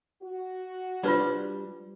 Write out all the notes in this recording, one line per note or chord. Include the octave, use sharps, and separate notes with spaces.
F#4
G3 D4 F4 B4 C5 D5